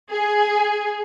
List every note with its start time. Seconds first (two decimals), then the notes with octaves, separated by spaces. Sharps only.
0.11 G#4